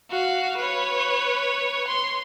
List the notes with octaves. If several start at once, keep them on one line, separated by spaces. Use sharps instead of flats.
F#4 F5
B4 C#5
C6